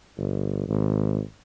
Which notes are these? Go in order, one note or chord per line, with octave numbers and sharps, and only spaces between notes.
G1
G#1